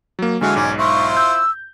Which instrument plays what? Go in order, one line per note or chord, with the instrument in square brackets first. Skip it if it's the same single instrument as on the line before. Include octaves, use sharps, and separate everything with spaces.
[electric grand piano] F#3 A#3
[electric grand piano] D3 G#3 F#4 [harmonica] E3 F5 [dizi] G#5
[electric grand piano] B1 G#2 [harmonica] C#4 D5
[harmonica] E4 F4 C5 [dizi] C#6
[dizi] E6 [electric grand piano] G6